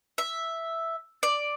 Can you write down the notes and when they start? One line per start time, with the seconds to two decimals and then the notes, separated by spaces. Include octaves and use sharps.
0.18 E5
1.23 D5